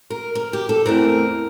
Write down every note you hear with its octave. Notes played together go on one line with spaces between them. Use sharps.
A#4
A#4
G4
A4
E2 E3 A3 C4 A#4